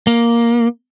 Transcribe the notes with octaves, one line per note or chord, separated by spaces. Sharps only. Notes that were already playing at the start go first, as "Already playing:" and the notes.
A#3